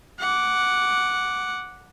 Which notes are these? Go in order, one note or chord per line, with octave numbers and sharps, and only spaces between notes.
F#5 D6